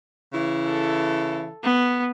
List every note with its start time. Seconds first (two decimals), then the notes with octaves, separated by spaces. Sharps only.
0.33 C#3 E3 E4
0.67 A4
1.64 B3